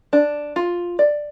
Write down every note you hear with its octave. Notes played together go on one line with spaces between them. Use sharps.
D4
F4
D5